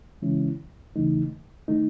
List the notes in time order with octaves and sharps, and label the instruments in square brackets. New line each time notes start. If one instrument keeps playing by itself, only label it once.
[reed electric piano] C#3 E3 G#3 C#4 E4
E2 C#3 E3 A3 D#4
D#3 A3 D#4